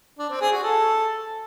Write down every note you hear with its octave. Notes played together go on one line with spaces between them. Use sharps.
D4
C4
G#4
F#4
A4